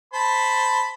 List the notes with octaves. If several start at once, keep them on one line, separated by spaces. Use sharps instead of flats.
C5 A5 B5